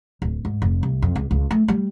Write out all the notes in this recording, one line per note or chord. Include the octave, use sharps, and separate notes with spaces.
D1
G#2
F1
C2
F2
C#2
C#2
A3
G3